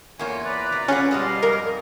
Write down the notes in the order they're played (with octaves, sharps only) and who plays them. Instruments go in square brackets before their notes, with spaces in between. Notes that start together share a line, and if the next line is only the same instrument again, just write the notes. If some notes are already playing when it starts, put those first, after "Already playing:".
[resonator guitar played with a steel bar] E2 A#3 F4 [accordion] C#5 G#5
[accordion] B4 D5 A#5
[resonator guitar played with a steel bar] C3
[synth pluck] C#4 [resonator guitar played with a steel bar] F4 G#4 F#5
[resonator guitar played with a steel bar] B2 G#3 F#4 [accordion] G3 D#5 F5
[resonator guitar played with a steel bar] F2 G#2 [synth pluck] A#4